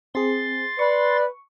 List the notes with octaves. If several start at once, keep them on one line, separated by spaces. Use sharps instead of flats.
C4 G#4 C6 A6
B4 D5 C#6